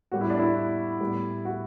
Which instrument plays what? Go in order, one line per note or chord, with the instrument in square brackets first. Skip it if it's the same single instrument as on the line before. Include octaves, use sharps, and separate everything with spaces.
[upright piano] A2 G3 B3 F#4
E4
D4
E4
A2 G3 B3
F#4